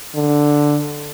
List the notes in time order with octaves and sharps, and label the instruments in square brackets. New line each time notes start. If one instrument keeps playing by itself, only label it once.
[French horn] D3